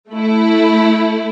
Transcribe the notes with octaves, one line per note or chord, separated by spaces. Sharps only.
A3 E4